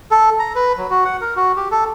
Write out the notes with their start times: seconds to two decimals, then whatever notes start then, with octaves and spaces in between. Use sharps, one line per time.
0.11 A4
0.39 A#5
0.55 B4
0.78 F#3
0.90 F#4
1.05 F#5
1.21 A#4
1.36 F#4
1.57 G4
1.71 A4